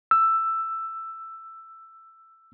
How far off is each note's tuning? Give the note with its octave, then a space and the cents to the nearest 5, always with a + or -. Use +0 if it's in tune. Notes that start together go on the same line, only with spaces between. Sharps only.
E6 +10